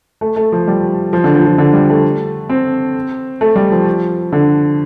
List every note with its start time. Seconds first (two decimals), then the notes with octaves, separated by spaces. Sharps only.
0.21 A3
0.36 A3
0.52 F3
0.68 G3
1.13 F3
1.24 D3
1.35 F3
1.47 F3
1.58 D3
1.73 G3
1.89 A3
2.49 C4
3.41 A3
3.56 G3
3.72 F3
4.33 D3